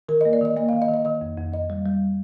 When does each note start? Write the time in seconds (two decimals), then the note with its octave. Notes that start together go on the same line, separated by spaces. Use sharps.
0.09 D#3 A#4
0.21 D#5
0.25 A#3
0.33 D5
0.41 D#3 D#5
0.57 A#3 D#5
0.69 F5
0.73 D#3
0.82 D#5
0.89 D#3
0.94 D#5
1.05 D#3 D#5
1.21 F2
1.37 F2
1.53 F2 D#5
1.70 G3
1.86 G3